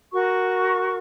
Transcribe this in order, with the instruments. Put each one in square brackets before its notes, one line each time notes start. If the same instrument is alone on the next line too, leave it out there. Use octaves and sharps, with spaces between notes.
[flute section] F#4 A#4 C#6